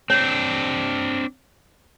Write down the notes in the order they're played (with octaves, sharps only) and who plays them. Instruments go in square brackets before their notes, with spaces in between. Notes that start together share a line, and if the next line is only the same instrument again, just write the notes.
[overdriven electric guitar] C4 D4 [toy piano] C#5